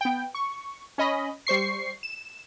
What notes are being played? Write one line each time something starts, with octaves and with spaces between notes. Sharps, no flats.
B3 G5
C#6
C#4 D#5 B5
G3 C5 C#6 C7
E7